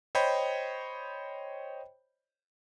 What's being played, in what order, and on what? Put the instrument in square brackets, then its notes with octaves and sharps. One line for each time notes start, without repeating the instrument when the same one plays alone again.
[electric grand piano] C5 C#5 D#5 G5 B5